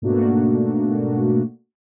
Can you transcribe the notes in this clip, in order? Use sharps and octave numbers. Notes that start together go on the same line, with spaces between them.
G#2 B2 A3 A#3 D4 F#4